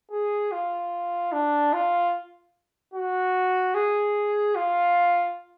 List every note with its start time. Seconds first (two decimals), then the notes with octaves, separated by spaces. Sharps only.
0.11 G#4
0.52 F4
1.33 D4
1.73 F4
2.94 F#4
3.74 G#4
4.56 F4